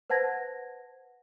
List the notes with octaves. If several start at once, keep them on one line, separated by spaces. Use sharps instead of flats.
B4 C5 F#5 A5 G#6 A#6